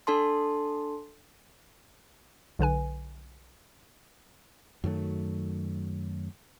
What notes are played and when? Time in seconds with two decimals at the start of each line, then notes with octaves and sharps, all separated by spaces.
0.07 D4 A4 A5 C6
2.59 B1 D3 B4 G#5
4.84 F#2 D#3 F#3 A3